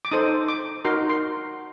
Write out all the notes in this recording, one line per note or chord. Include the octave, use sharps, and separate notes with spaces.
D6
D#4 A4 C5 D#6
D6
D#4 F#4 A#4 C6
C6